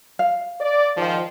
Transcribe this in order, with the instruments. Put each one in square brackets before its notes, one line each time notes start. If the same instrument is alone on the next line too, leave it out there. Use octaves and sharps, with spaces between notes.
[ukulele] F5
[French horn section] D5
G#2 D#3 F3